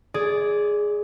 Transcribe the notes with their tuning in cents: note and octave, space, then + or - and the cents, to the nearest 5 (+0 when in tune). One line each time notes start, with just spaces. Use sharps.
G#3 +40 G#4 +0 D5 -10